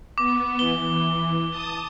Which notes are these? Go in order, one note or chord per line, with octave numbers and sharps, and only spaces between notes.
B3 D6
E3 G7
A5 D#6